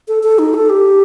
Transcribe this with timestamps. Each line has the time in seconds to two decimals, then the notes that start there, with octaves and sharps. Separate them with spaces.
0.08 A4
0.23 A4
0.39 D#4
0.54 A4
0.70 G4